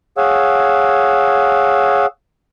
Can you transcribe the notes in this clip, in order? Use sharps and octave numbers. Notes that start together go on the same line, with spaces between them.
G#4 C#5 F5 F#5 E6